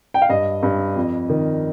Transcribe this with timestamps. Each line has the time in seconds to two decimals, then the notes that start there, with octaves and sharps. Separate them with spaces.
0.14 G5
0.22 F5
0.29 G2 D#5
0.63 G2
0.96 F2
1.29 D#3